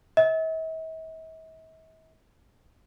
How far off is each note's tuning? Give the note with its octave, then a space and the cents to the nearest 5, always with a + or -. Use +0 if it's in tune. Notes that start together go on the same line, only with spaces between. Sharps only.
E5 -45